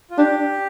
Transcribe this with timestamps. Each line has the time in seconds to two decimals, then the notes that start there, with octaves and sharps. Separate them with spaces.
0.11 F4
0.18 D4 G4